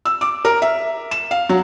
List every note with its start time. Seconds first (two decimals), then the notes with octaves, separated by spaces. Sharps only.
0.05 E6
0.21 D6
0.45 A#4
0.62 E5
1.11 E7
1.31 F5
1.49 F#3